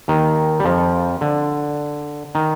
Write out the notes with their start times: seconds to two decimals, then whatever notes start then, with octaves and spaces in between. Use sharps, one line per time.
0.08 D#2 D#3
0.60 G3
0.65 F2 F3
1.21 D3
2.35 D#3